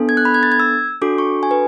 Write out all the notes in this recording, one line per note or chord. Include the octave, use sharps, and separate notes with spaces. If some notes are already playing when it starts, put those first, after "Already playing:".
Already playing: B3 D4 A4
G#6
F#6
B5
G#6
A6
G#6
E6
D4 F#4 A4 D6
C#6
G#5
B4